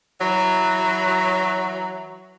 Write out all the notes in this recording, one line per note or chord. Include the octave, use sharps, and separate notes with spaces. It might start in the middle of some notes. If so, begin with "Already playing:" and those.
E3 F#3